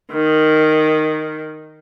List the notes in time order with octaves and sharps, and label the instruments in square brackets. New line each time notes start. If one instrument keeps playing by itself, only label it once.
[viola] D#3